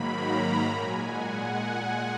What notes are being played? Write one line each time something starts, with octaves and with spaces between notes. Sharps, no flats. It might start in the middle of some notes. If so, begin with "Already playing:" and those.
Already playing: G#2 D#3 F#3 A#3 B5
A#5
A#2 G#3 G#5
F#5
G#5